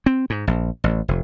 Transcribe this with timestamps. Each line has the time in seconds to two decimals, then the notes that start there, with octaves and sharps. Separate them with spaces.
0.06 C4
0.30 G#2
0.47 A#1
0.84 A1
1.08 F1